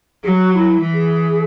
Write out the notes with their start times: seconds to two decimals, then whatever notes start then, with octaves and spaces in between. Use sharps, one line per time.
0.24 F#3 F#4 G#4
0.52 F#4
0.55 E4
0.80 E3
0.94 G#4